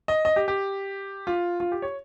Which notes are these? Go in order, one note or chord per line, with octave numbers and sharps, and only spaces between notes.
D#5
D#5
G4
G4
F4
F4
G4
C#5